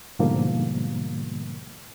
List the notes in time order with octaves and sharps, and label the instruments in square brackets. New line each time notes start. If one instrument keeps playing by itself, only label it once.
[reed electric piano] G#2 B2 D3 F3 G3 A#3